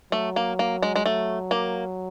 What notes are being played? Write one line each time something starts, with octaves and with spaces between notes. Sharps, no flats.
F#3 A3
A#3
A#3
G#3
G#3
F#3 A3
A#3